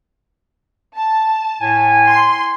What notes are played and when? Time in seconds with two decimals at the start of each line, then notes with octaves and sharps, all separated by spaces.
0.95 A5
1.61 A2 G#5
2.07 C6